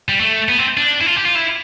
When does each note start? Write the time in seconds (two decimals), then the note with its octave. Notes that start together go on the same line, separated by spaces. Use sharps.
0.09 G3
0.20 A3
0.49 B3
0.59 C4
0.77 D4
1.01 E4
1.06 F4
1.16 G4
1.25 F4
1.35 E4